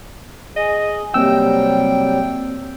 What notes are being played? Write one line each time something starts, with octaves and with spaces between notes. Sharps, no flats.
G#4 D#5
C3 F#3 G3 A#3 C4 G5 E6